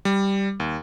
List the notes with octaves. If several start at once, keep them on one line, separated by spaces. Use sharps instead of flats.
G3
D#2